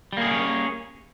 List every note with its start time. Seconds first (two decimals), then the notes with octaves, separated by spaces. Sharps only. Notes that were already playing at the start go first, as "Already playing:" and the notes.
0.13 G3
0.17 A#3
0.22 G#4
0.26 B3
0.31 C#4